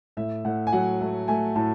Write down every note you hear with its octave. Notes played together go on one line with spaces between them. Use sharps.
A2 E5
A2 F#5
G#5
F#3 F#5
A3
A3 G#5
A2 A5